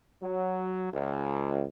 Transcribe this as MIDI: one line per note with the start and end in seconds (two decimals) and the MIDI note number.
0.22 0.92 54
0.92 1.64 37